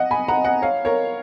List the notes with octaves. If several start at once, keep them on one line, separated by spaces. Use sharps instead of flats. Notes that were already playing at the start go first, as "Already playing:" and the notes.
Already playing: D#5 F#5
G#5 B5
F#5 A#5
D#5 F#5
C#5 F5
A#4 C#5